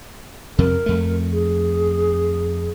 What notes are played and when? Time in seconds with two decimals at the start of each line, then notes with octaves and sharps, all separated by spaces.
0.58 F2 C3 A#4
0.86 F2 A3
1.32 G#4